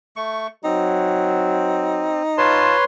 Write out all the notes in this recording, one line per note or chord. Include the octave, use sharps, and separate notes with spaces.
A3 C#6
F#3 C4 D#4
F4 B4 C#5 A5 C6